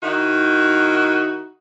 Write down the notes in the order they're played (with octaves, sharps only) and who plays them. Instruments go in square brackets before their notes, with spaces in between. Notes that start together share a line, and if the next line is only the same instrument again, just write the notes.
[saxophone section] D#3 D#4 E4 F#4